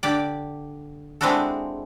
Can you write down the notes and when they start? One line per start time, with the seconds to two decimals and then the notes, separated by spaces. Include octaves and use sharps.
0.03 D3 G4 D5
1.21 G#3 C4 D4 E4 F#4 A4